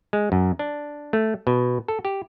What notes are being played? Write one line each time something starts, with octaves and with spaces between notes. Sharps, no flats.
G#3
F#2
D4
A3
B2
A4
G4